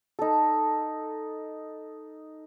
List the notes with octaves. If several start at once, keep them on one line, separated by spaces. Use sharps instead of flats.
D#4 A4